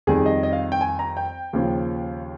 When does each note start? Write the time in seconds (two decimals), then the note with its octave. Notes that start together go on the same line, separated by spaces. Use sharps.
0.07 F2 D#3 G3 G#4
0.26 D#5
0.43 D#5
0.52 F5
0.72 G5
0.81 G#5
0.99 A#5
1.17 G5
1.53 D#2 C#3 F3